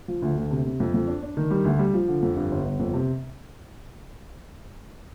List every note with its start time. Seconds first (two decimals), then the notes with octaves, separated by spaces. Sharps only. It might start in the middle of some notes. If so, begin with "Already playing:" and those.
0.08 F3
0.22 D2
0.37 D2
0.51 C3
0.65 C3
0.80 F2
0.94 F2
1.07 D4
1.23 D4
1.37 D#3
1.51 G3
1.65 D2
1.79 G3
1.94 F3
2.08 D3
2.23 F2
2.36 G2
2.51 G1
2.65 G1
2.79 F2
2.94 C3